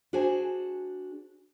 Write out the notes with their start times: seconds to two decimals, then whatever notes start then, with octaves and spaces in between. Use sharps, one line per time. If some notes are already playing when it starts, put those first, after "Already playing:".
0.13 D4 F#4 G#4 C5 G#5